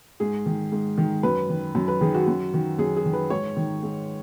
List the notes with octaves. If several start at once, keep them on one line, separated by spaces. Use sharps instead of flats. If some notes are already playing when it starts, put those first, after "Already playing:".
G#2 G#4
D#3
G#2
D#3
F#2 B4
D#3
F#2
B4
D#3 G#4
F#4
F#2
D#3
F#2 G#4
G#4
D#3
B4
G#2 C#5
D#3
G#2